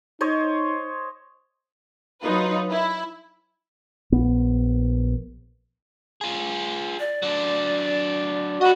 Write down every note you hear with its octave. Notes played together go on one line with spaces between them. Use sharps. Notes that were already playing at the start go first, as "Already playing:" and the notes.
D#4 C5 C#5 D#5
F#3 D#4 F4 B4
E4
A#1 B3
F4 G#4
D5
F#3 D4
F#4 D#5 B5